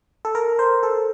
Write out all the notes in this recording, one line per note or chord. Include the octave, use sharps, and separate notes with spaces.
A4
A#4
C5
A4